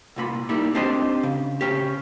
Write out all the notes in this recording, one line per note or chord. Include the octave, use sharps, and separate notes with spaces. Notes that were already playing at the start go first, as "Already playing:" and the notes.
C2 A#2 B5
G3 A#3 D#4 E4
C4 D4 G4 C5 D5 D#5
C#3
C#3 C#4 G4